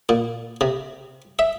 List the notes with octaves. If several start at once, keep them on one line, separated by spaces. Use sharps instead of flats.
A#2
C3
E5